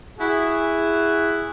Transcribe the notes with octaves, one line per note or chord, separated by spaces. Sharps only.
E4 F#4 G#4